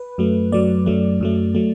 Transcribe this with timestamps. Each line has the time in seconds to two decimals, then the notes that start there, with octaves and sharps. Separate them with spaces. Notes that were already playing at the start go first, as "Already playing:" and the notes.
Already playing: B4
0.18 F#2 F#3 A3
0.52 F#2 F#3 A3 D5
0.86 F#2 F#3 A3
1.21 F#2 F#3 A3
1.55 F#3 A3